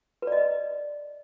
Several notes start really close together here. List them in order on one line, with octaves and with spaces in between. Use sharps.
B4 D5 D#5